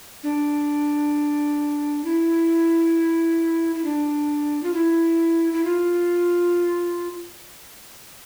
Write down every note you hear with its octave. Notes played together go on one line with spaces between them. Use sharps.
D4
E4
E4
D4
F4
E4
E4
F4